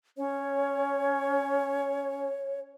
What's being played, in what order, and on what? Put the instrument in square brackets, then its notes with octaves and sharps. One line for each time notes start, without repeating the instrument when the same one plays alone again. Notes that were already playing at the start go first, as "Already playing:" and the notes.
[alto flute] C#4 [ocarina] C#5